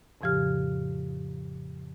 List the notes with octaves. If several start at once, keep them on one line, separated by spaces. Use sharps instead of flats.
F2 A2 C#3 F3 G4 F6